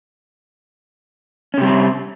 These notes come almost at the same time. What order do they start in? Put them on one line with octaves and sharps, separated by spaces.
C#4 C3 G3 C4